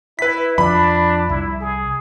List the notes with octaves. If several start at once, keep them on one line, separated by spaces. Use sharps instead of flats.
E4 B4 B6
F2 F3 D4 B5
C2 E4
G#4